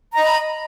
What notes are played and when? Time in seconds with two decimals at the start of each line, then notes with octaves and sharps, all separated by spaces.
0.12 A#5
0.17 D#5
0.21 B5